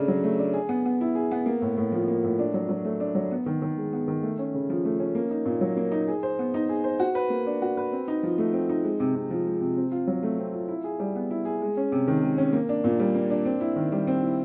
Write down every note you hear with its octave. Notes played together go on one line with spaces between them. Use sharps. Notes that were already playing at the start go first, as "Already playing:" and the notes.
Already playing: C#3 A3 D4
F#3
A3
D4
G#4
B3
B3
E4
G#4
B3
A#3
A2
A2
F3
A#3
A2
D4
F#3
F#3
A3
D4
F#3
B3
D#3
D#3
G#3
B3
D#3
A3
C#4
C#3
F3
A3
C#4
A#3
D#4
A#2
F#3
A#3
D#4
G#4
C5
B3
D#4
G#4
C5
F#4
B4
A#3
D4
F#4
B4
C4
D#4
F3
A3
C4
D#4
G#3
C3
C3
F3
G#3
C3
C4
F4
F#3
A3
C4
F4
E4
G#4
G3
B3
E4
G#4
G#3
C#4
C3
D#3
G#3
C#4
A#3
D4
A#2
G3
A#3
D4
C4
E4
D#3
G3
C4
E4